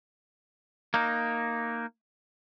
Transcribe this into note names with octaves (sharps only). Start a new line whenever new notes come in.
A#3 D#4